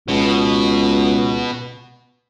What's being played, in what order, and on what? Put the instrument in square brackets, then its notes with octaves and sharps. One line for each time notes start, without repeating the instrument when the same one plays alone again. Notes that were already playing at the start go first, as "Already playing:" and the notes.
[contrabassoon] C#2 [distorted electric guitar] B2